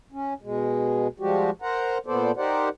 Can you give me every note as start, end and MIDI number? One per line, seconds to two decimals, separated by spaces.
0.12 0.34 61
0.42 1.08 47
0.42 1.08 56
1.20 1.50 53
1.20 1.50 55
1.20 1.50 56
1.20 1.50 66
1.20 1.50 67
1.62 1.98 70
1.62 1.98 72
1.62 1.98 78
1.62 1.98 82
2.06 2.31 46
2.06 2.31 59
2.06 2.31 69
2.06 2.31 72
2.06 2.31 74
2.37 2.69 63
2.37 2.69 67
2.37 2.69 70
2.37 2.69 72
2.37 2.69 74
2.37 2.69 78